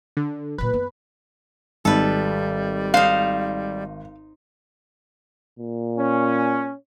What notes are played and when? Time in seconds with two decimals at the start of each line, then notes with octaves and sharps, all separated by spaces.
0.17 D3
0.58 A#2 F#3 B4
0.73 F#2 B3
1.85 G#1 G3 A4 B4
2.94 D#4 C5 F5
5.59 A#2
5.98 C#4